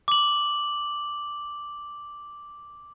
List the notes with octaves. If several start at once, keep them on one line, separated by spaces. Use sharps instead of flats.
D6 F#7